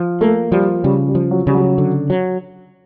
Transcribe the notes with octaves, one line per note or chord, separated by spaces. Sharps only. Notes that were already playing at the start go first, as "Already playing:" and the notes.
Already playing: F3
A3 A#3
F3 G3
C#3 G3
G3
F3
F#3
C#3 G3
F#3
D3
F#3